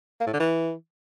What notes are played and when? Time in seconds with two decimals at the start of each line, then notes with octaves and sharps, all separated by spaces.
0.20 A#3
0.27 A2
0.33 D3
0.40 E3